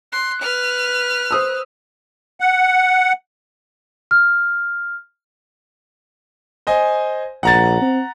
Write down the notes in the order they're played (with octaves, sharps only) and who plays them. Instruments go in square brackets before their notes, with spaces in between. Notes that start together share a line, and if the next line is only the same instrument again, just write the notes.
[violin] C6 [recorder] F#6
[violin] B4 F6
[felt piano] C5 D#6 E6
[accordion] F#5
[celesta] F6
[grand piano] C5 D#5 G#5
[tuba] A#1 [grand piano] F#5 A#5 A6
[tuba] C4